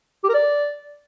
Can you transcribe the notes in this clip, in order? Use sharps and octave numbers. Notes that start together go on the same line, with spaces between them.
G4
A#4
D5